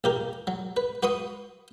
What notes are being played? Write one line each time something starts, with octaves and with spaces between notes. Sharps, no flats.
A#1 G4 A#4
F#3
B4
F#4 B4 C6 C#6 D#6